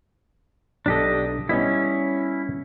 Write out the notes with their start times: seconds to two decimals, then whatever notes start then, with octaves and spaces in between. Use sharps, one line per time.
0.86 B1 D4 G4 A4 D#5
1.49 G3 B3 C#4 E4 D#5